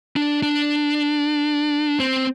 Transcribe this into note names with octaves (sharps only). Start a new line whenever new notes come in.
D4
D4
C4